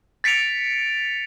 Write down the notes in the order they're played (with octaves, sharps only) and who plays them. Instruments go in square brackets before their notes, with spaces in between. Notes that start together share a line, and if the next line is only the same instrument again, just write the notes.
[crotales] A6 B6 C#7 D7 F7